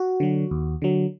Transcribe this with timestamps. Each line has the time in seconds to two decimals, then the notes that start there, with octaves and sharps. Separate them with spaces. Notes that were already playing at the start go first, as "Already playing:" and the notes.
Already playing: F#4
0.20 D3 F#3
0.51 D#2
0.82 D3 F#3